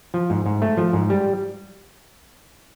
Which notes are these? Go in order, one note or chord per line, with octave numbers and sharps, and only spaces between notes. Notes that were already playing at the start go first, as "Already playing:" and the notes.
F3
G#2
G#2
A3
F3
G#2
G3